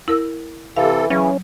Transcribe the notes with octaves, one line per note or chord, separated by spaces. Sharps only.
E4 A#4 E6
C3 E3 A4 F5
C#3 E3 F#3 C#4